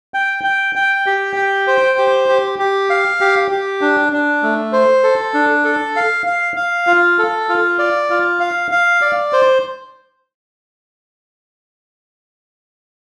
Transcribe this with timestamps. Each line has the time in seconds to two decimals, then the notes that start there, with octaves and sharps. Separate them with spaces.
0.14 G5
0.44 G5
0.76 G5
1.06 G4
1.36 G5
1.67 C5
1.98 G4
2.29 G4
2.59 G4
2.90 F5
3.21 G4
3.51 G4
3.81 D4
4.12 D4
4.43 A3
4.73 C5
5.04 A4
5.34 D4
5.64 A4
5.96 F5
6.26 F5
6.56 F5
6.87 F4
7.19 A4
7.49 F4
7.79 D5
8.10 F4
8.40 F5
8.71 F5
9.01 D5
9.33 C5